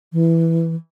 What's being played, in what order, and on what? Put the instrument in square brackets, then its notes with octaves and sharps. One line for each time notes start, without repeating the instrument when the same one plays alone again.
[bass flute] E3